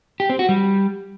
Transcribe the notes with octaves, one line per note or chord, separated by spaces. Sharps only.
G4
C4
F#4
G3